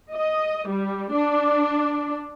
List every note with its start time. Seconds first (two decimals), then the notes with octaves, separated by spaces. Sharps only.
0.13 D#5
0.68 G3
1.12 D4